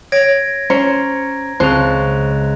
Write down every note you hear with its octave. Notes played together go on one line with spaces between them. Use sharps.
C#5 G#6 A#6 D7
C#4 C5 A#5
C#2 C4 C5 F#6 F7